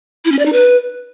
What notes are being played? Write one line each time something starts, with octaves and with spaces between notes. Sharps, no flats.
E4
C#4
D5
D#4
B4